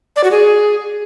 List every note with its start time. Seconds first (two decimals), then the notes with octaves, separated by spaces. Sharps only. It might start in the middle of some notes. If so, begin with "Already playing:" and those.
0.16 D5
0.24 F#4
0.31 G#4